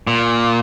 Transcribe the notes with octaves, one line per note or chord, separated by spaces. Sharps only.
A#2